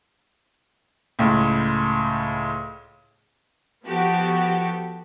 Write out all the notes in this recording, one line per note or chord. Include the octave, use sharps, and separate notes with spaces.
C#2 A2
F3 B3 F#4 G4 A4